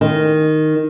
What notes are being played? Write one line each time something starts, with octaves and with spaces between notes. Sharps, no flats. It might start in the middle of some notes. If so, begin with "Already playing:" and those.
D#3